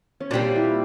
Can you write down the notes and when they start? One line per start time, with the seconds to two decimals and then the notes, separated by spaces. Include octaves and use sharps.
0.20 C#4
0.31 A#2 G3 C4 D4
0.56 E4